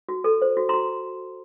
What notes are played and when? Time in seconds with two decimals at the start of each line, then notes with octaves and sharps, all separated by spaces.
0.09 F#4
0.24 A4
0.42 C5
0.57 F#4
0.69 F#4 A#5 C6